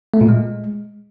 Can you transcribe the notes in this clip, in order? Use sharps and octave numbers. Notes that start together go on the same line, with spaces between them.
A3
A#2
G#3